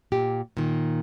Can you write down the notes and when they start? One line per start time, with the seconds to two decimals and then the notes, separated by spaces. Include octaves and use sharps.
0.12 A#2 G4
0.57 A#2 D#3